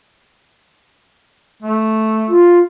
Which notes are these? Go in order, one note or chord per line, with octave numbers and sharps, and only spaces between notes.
A3
F4